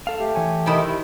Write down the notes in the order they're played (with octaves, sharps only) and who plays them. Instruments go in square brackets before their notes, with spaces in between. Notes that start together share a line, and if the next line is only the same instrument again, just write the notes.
[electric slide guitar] A4 F5
[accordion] A3 G4
[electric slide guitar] E3 C#5 G#5
[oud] C3 D#3 E4